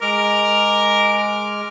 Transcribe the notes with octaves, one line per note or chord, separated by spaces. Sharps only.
G#3 A#4 D6 F6